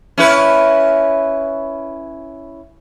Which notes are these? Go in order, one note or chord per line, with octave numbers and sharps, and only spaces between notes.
C#4 E4 B4